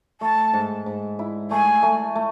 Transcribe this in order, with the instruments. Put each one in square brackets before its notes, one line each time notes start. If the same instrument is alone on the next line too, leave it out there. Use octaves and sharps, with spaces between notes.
[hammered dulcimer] A3 [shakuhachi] A5
[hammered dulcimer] G#2
G#2
E4
[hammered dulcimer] A3 [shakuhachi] G#5
[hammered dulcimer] A3
A3